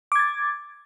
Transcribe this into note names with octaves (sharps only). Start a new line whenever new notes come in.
D6 G#6 A6